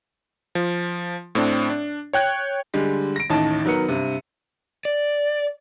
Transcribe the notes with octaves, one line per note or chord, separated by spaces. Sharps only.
F3
A2 C4 D4
D4
C#5 G5 F#6 G#6
D3 G3 G#3
A#6 D7
A1 D#2 A2 D#3 D#4 A5
D#3 F#3 B3 A#4 C#7
G2 C3
D5